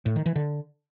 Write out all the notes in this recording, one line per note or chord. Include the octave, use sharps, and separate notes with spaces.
A2
D#3
E3
D3